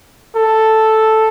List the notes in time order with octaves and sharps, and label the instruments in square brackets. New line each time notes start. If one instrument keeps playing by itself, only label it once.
[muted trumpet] A4